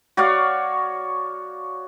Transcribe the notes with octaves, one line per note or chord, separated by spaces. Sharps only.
F#4 C#5 D5 F5